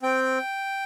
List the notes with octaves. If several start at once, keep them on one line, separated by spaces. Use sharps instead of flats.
C4 G5